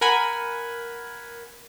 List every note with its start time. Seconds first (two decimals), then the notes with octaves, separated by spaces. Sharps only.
0.01 A#4 F#5 G#5 B5